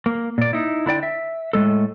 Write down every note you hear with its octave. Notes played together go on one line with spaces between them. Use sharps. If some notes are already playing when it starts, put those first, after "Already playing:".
A#3
A#2 D5
D#4 E4
D3 E4 D5 G5
E5
A2 G#3 A4